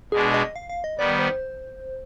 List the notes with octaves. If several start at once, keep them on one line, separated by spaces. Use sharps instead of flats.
B2 G#3 D4 G#4
D#5
F5
F5
D#5
D#3 G3 B3 D5
C5